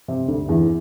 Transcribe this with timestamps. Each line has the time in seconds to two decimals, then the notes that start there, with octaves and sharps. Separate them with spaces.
0.08 C3
0.28 D2 D3
0.48 E2 E3